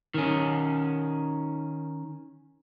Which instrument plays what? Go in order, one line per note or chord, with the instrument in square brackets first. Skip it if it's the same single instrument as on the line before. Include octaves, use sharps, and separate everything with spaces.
[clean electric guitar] D#3 C#4